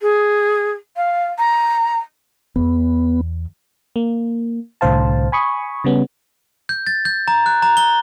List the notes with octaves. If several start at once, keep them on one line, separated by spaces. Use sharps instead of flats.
G#4
F5
A#5
E2 B3
A#3
C2 A2 D3 C5 F5 A5
G#5 B5 C#6 D#6
C#3 G3 B3 C#4
G6
A6
G6
A#5
F#6
A#5
G7